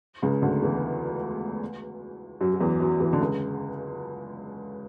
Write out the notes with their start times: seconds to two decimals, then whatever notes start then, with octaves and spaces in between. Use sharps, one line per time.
0.22 C#2 C#3
0.42 D2 D3
0.62 E2 E3
2.41 F#2 F#3
2.54 F#3
2.61 E2 E3
2.80 F#2 F#3
3.00 E2 E3
3.13 D3
3.21 C#2 C#3